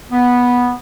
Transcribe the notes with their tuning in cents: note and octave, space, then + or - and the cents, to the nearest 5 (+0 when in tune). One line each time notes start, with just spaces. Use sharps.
B3 -10